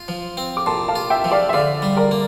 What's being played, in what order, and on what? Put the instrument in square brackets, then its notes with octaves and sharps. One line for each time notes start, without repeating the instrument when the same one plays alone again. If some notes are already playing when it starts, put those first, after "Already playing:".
Already playing: [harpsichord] F4
F3
C4
[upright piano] D6
[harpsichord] A#2 [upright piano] A5 C6
[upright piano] F5 A5
[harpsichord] F4
[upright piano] E5 G5
[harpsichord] F3
[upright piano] D5 F5
E5
[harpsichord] D3 [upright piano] D5 F5
[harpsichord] G3
[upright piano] A#4 D5
[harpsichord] A#3